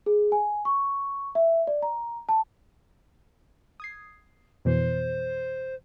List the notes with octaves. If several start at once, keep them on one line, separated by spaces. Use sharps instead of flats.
G#4
G#5
C#6
E5
D5
A#5
A5
D#6 G#6 C7
F2 B2 E3 C5